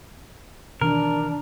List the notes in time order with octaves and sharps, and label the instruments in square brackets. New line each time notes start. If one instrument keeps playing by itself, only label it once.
[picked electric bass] B2 D#3 E3 [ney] D4 [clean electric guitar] A#4